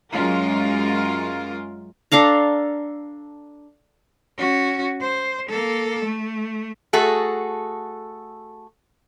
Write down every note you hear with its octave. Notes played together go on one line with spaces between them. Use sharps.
F#2 G#3 F4 A#4
D4 A4 F5 A#5
C#4 F#4
C5
A#3 A4
A3
A3 F#4 G#4 A4